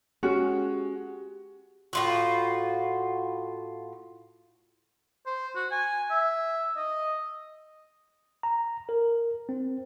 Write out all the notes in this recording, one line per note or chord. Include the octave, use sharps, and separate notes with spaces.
G#3 C#4 F#4 G4
A2 F4 F#4
C5
F#4
G#5
E5
D#5
A#5
A#4
C4